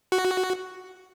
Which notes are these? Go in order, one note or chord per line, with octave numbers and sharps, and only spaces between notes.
F#4